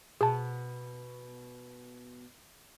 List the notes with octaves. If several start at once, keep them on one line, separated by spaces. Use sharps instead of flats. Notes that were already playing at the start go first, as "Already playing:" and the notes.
B2 G#4 A5